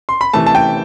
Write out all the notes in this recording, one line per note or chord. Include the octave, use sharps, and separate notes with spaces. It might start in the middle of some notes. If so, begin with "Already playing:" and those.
C6
B5
C3 E3 A3 A5
A5
G5